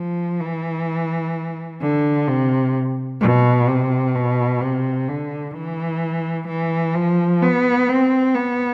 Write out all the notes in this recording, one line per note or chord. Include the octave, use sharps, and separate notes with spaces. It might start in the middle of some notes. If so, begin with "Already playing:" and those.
Already playing: F3
E3
D3
C3
B2
C3
B2
C3
D3
E3
E3
F3
B3
C4
B3